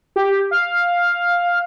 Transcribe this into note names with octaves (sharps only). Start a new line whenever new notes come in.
G4
F5